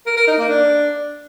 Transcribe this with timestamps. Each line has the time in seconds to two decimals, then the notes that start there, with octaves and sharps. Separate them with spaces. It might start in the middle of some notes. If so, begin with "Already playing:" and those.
0.06 A#4
0.17 A#4
0.28 D#4
0.38 A#3
0.49 D4